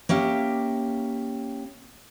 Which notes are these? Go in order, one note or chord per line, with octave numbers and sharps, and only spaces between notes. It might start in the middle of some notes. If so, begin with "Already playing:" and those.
A#3 C#4 G4 E5